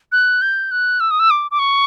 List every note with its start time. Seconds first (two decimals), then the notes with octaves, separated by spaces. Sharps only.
0.12 F#6
0.42 G6
0.71 F#6
1.00 E6
1.11 D#6
1.20 E6
1.31 D6
1.51 D6
1.59 C#6